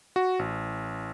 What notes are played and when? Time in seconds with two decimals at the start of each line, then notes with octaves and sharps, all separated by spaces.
0.16 F#4
0.39 A1